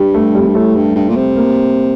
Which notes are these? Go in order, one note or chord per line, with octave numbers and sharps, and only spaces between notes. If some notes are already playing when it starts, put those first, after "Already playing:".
Already playing: G2 G3
A3
G3
F2
G2
A2 A3
G2
G2
A#2
C3
A#3